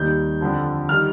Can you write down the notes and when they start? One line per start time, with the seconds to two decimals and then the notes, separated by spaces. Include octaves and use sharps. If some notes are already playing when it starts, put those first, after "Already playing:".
Already playing: D#2 D#3 G3 G6
0.41 F2 D3 F3
0.89 D#3 G3 F6